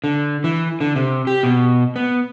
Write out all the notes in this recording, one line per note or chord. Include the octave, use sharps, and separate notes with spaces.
D3
E3
D3
C3
G4
B2
B3